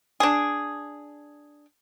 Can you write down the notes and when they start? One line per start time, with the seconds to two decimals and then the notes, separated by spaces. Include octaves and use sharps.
0.20 D4 G#4